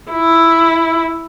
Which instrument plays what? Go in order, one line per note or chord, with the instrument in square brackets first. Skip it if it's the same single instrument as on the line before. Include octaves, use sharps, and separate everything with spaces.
[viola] E4